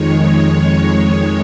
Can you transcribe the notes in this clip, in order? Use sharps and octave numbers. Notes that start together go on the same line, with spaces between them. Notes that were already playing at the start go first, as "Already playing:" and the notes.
Already playing: F2 D#3 G#3 C#5
F2 D#3 G#3 C#5